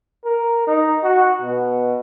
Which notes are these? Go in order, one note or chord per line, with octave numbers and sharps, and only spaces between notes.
A#4
D#4
F#4
B2